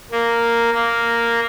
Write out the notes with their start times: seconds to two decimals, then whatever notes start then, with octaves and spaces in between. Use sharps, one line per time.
0.11 A#3
0.74 A#3